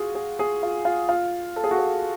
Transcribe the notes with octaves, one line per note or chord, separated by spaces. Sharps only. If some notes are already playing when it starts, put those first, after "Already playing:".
Already playing: F4 F#4 G#4
G#4
G#4
F4
F4
F4
A4
G#4
F#4
G#4